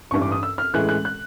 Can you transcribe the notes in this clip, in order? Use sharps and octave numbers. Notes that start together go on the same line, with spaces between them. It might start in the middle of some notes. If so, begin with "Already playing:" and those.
A1 G2 E3 C#6
D6
D#6
E6
F6
A1 A2 E3 G#3 F#6
F#6
F#6